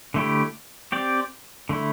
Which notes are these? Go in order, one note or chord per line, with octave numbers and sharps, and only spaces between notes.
D3 A3 E4 G4
C4 G4 D5
D3 A3 E4